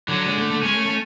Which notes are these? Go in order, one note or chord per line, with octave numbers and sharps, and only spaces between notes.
D3 F#3
G#3
A3
A3
G#3 C#4
A3
A3